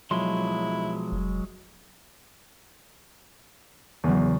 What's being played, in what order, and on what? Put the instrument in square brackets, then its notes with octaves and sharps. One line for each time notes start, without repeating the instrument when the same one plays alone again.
[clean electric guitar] B1 F3 C6 [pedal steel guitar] F#3 G#3 [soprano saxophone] E4
[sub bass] F1
[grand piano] E2 [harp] C#3 F#3